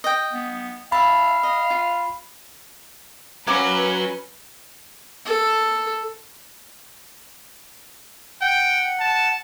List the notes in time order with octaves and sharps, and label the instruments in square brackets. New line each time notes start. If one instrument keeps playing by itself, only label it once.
[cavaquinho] D#5 G5
[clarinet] B3
[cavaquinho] E4 E5 A5 [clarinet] F5 [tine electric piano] B5
[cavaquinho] D#5
F4
[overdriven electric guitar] F#3 F#4 [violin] C#4 [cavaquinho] A#4 F5 D6 [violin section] B4
[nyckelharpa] A4
[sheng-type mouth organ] F#5 [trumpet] G5
[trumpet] A5